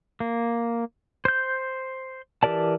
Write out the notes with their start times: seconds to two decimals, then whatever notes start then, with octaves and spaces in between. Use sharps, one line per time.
0.20 A#3
1.25 C5 G6
2.43 E3 G4 A#4 D5 A5